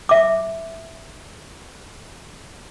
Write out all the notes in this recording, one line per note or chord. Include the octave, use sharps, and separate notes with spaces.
E5 D6